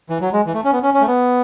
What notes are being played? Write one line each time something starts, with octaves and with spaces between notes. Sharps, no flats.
E3
F#3
G#3
E3
A3
C#4
B3
C#4
C#4
A3
B3